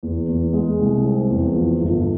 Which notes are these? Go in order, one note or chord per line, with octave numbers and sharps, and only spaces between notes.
E2
E2
G#3
C2
C4
E2
F3
G1